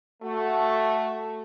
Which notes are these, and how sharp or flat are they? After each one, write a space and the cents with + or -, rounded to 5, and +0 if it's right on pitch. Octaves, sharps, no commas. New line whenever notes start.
A3 +0 F#4 +0